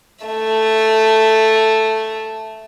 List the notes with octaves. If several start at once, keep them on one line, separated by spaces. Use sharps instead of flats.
A3 E5